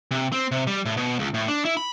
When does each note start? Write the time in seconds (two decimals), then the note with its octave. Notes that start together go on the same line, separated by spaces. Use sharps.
0.11 C3
0.32 C4
0.51 C3
0.67 G3
0.86 A2
0.97 B2
1.19 C#2
1.34 A2
1.48 D4
1.65 E4
1.77 B5